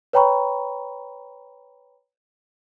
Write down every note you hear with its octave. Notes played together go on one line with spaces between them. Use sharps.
B4 C#5 G5 A#5 B5 C#6